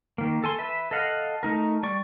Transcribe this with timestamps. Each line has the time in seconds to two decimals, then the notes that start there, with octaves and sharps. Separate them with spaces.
0.18 D#3 A#3
0.44 A4 G#5 C6
0.59 B4 E5
0.91 A4 D#5 F5 F#5
1.43 A3 D#4 A#4
1.83 G3 D5 C#6